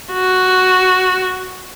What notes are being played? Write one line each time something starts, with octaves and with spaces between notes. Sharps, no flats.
F#4